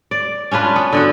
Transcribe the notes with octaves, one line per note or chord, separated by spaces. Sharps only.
D5
C#4 D4 F4 B4
B3
D3 B3 F#4